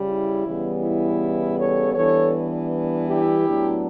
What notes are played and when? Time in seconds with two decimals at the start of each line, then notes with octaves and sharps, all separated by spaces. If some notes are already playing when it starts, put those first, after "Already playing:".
Already playing: C#3 G3
0.09 E4
0.45 C#3 E3 G3 B3
0.83 E4
1.58 A4 C#5
1.95 E3 G3 B3 D4 A4 C#5
3.07 E4 G4
3.45 A2 F#3 B3 D4